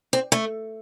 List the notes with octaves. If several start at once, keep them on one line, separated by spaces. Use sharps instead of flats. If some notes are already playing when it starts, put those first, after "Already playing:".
C4
A3